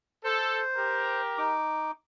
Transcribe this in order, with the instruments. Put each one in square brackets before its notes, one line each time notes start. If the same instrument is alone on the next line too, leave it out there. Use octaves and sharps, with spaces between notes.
[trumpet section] A4 [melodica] C5
[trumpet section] G4 A#4
[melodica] D#4 D6